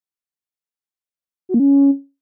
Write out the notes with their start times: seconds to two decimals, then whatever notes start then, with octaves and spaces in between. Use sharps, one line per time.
1.49 F#4
1.54 A#3
1.60 C#4